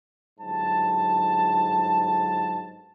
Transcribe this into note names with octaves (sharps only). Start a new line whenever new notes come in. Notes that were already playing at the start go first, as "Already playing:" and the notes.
G1 G#2 F#3 A5